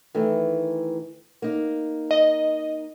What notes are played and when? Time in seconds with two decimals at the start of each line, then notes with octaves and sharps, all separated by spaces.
0.14 D#3 E3 A3
1.42 A#3 D#4
2.11 D#5